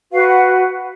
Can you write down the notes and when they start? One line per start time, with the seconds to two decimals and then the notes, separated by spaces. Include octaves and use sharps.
0.11 F#4 B4 F5
0.29 F#5